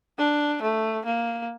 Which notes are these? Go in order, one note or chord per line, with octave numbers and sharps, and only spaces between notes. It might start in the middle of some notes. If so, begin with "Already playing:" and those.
D4
A3
A#3